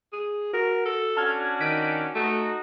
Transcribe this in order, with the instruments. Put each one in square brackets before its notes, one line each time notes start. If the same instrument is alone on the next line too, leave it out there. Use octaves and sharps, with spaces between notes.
[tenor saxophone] G#4
[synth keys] F#4 [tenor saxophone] A#4
[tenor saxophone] A4
[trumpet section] C#4 D4 F#4 [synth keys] A5 F6 G#6
[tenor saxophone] D#3 [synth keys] B6 D7 D#7
[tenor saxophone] A3 [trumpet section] D#4 F#4 [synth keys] A5